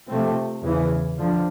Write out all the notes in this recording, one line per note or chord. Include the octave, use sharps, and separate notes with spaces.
C3 F3 A3 C4
E2 C#3 E3
D3 F3